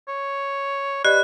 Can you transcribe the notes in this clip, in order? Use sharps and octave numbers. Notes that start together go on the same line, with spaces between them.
C#5
G4 B4 D5 D#5 F#6